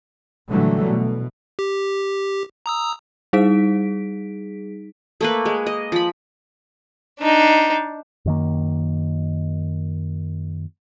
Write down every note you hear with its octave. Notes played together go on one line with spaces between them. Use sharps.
A#2 D3 E3 F#3 G3 A3
B2
G4
A#5 D#6 E6
G3 D#4 G#4 B6 D7
A3 A#3 B4
G#3
D#5
F3 B5
D4 D#4
F#2 D#3 A#3